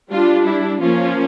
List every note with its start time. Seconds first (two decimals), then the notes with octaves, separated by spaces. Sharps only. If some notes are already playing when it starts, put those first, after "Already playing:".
0.11 G3 D4 F4
0.47 E4
0.81 F3 A#3 C#4 F4